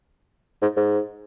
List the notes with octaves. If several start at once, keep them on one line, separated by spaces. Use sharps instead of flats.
G#2
G#2